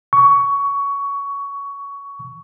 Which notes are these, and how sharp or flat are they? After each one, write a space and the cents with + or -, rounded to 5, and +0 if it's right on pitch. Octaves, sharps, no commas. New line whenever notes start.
C#6 +15